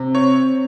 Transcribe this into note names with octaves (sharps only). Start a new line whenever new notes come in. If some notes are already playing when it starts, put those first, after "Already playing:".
Already playing: C3
C4 C#5